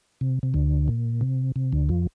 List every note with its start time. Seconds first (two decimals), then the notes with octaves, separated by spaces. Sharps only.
0.21 C3
0.43 C3
0.54 D2 D3
0.88 A#2
1.21 C3
1.56 C3
1.72 D2 D3
1.89 F2 F3